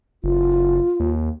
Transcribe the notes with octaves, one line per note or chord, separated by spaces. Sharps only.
F#1 F4
D#2